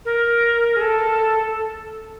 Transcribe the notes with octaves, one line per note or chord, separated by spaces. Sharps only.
A#4
G#4
A4